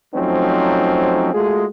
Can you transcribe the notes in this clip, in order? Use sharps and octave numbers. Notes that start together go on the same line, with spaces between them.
F3 F#3 A3 C4 C#4 D#4
G#3 A3 F4 F#4 G#4